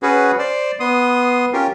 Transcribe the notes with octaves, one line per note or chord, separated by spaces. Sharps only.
C#4 F#4 G#4 B4
C5 D5
B3 C6 D#6
C#4 F4 G4 A#4